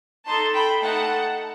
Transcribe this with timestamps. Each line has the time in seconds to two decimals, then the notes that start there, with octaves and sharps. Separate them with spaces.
0.26 D#4 A4 A5 C6
0.54 G5 B5
0.82 A3 D#4 A4 F#5 A5